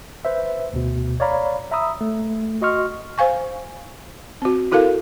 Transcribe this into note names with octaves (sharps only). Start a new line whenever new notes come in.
B4 C5 E5
D2 B2
C#5 D5 F5 A#5 B5
E5 A#5 B5 D#6 E6
A3
F#4 D#5 C6 C#6 F6
C5 F5 G#5 C#6
C4 F#4
E4 F#4 A4 A#4 F5